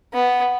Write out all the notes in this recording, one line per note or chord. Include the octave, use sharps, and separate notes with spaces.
B3